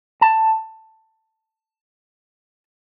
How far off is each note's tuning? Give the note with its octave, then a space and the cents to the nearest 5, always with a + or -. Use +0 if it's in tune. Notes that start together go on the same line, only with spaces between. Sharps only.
A5 +10